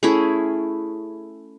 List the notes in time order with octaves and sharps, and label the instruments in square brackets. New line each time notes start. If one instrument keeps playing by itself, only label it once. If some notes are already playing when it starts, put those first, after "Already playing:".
[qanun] A3 C#4 E4 G#4